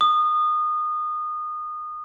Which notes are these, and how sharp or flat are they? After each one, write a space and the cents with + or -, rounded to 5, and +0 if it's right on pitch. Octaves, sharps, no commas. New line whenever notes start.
D#6 -25